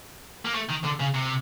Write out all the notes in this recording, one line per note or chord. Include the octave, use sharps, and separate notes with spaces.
A#3
A3
D#3
D3
C#3
C3